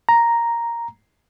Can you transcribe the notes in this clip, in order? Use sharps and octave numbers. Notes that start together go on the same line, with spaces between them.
A#5